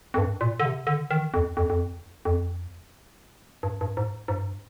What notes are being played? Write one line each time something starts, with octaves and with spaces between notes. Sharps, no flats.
F2
G2
A#2
D3
C3
D3
D#3
F2
F2
F2
F2
G2
G2
G#2
G#2
G2